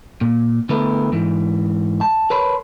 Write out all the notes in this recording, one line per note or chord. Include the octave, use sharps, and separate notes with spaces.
A#2
D3 A3 B3 E4 A4 A#4
G#2 E3
A5
A#4 B4 C#5 A5 B5 C6